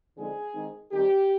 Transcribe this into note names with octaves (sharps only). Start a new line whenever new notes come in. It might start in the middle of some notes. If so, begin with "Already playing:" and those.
D3 F3 G#3 C4 D#4 G#4
D#3 G#3 C4 D#4
D#3 G3 C4 G4